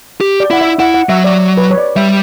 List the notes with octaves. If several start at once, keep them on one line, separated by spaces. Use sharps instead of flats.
G4
D5
E4 F#5
E5
E4 F#5
F#5
F#3 E5
D5
B4
C#5
D5
G3 E5